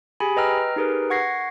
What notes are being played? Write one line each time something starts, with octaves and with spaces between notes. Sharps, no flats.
G4 G#4 G#5 B5
B4 D#5 G5 A#5 E6 F6
D#4 G4 G#4 A#4 B4
F#5 C#6 G#6 A#6 C7